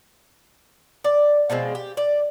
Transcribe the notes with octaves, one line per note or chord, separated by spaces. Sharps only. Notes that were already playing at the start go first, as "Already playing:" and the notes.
D5
B2 F3 G#3 C4
G4
D5